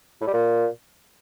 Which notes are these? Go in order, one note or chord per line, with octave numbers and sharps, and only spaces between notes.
A2
G3
A#2